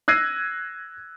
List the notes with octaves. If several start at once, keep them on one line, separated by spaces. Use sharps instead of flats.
E6 F#6 G#6 A#6 C7 D#7